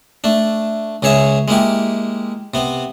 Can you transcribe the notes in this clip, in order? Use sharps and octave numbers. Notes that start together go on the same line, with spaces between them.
A3 D4
C#2 C#3 G#4 C#5 E5
G#3 A#3 E4 G4
C3 B3